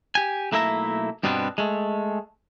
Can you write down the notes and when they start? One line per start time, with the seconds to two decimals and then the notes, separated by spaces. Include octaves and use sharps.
0.15 G4 G#5
0.52 B1 A3 A#3 E4 E5 A#5
1.23 G2 B2 G3 B3 C4 D4
1.58 G#3 A3